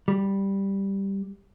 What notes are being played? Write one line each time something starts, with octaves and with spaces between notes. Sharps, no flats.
G3